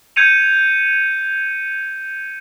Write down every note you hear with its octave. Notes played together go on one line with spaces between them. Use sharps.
G6 G#6 C#7 D#7 F7